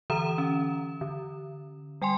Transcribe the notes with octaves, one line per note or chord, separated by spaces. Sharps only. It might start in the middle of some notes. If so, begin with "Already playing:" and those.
D3 E3 A#5 D#6 E7
C#4
D3
G3 G5 G#5 C6